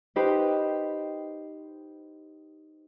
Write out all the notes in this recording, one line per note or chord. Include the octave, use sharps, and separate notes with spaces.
D#4 G4 B4 C5